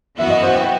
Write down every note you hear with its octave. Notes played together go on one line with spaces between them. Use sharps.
F#2 E3 B3 F#4 E5
D#5
C5
F#5
G5